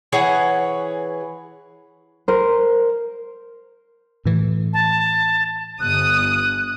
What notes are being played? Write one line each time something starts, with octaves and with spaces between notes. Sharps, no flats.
E3 G#4 C#5 F#5
A#4 C5
A2 E3
A5
G1 D#6 F#6